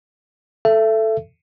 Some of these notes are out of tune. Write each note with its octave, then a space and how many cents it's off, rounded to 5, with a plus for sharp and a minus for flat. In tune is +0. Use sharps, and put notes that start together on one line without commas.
A4 +0 E5 +25